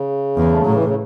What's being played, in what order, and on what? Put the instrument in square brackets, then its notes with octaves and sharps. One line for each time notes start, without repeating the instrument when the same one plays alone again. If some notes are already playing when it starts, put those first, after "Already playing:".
Already playing: [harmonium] C#3
[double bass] E2
[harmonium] A3
[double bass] A2 [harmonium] F#3
[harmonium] E3
C#3